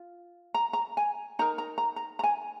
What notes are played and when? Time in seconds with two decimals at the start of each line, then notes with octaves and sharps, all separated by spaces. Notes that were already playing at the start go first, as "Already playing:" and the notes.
Already playing: F4
0.54 A#5
0.73 A#5
0.97 G#5
1.39 D#4 A#4 A#5
1.58 A#5
1.78 A#5
1.96 A#5
2.19 A#5
2.24 G#5